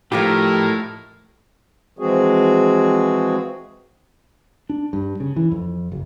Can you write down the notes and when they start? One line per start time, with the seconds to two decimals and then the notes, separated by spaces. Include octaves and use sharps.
0.12 A2 F3 D#4 F4 G4 A#4
1.99 E3 F3 G#3 C4 F#4 G#4
4.69 D4
4.93 G2
5.20 C#3
5.36 E3
5.52 F2
5.92 F#1